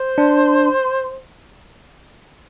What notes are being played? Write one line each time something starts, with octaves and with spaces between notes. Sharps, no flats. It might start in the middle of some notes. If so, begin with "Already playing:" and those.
Already playing: C5
D4